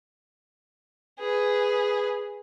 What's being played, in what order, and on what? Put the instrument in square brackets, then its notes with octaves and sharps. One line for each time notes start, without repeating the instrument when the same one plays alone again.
[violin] G#4 B4